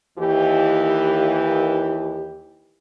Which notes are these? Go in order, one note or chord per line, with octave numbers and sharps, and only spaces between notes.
D#2 E3 G4